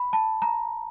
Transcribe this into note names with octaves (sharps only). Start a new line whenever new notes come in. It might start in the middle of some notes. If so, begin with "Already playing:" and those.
Already playing: B5
A5
A#5